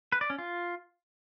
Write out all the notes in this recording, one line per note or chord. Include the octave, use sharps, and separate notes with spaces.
B4
D5
C#4
F4